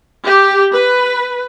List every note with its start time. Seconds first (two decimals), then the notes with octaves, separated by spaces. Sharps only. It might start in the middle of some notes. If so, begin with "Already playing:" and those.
0.24 G4
0.71 B4